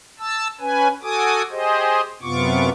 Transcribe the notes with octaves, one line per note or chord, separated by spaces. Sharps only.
A5 E6
C#4 B4 G#5
F#4 A4 G#5 D6 D#6
G4 G#4 C5 D#5
F#2 C3 B3 F4 C#6 D6